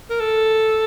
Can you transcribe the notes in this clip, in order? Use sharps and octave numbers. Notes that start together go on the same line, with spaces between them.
A#4
A4